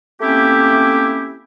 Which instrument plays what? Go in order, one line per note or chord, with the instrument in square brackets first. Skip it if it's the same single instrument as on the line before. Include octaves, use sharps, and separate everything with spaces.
[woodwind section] A3 A#3 C4 C#4 E4 G4